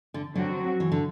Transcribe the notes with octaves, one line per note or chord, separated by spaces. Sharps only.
D3
D3 F#3 C4 F#4
E3
D3